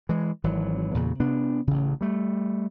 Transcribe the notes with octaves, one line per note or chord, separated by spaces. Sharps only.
E3 G#3
G#1 E3 F#3
E2 A#2 C#3
C3 B3 D4
A1 C#3
G3 A3